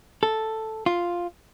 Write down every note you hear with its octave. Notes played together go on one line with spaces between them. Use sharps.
A4
F4